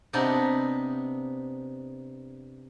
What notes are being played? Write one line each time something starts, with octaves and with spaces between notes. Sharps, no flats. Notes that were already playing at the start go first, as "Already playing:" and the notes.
C3 B3 D4 D#4